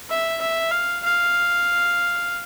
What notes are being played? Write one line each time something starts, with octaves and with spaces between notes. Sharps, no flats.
E5
E5
F5
F5